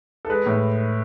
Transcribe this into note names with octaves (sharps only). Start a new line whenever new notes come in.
A4
G#3 B4
A2